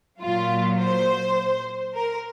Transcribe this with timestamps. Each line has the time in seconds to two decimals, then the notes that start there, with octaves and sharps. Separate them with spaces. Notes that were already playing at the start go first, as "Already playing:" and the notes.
0.22 A#2 F#3 F4
0.79 C5
1.95 A#4